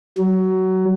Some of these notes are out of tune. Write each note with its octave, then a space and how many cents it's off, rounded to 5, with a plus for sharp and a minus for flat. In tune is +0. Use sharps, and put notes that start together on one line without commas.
F#3 +20